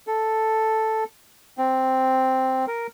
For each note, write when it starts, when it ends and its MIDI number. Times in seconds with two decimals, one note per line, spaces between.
0.07 1.04 69
1.58 2.65 60
2.67 2.87 70